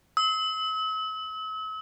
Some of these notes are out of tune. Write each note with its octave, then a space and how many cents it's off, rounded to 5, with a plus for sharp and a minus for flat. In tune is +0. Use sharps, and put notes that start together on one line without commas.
E6 -45